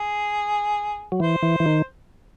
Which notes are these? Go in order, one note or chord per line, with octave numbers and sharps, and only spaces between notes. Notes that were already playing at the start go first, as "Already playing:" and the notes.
Already playing: G#4
F#3
E3 C5
E3
E3
D#3